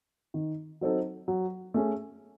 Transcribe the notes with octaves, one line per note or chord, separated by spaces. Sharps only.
D#3
F#3 C4 D#4 A4
F#3
A3 C#4 G#4